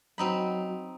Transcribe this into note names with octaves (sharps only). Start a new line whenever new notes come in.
F#3 C4 D#4 B5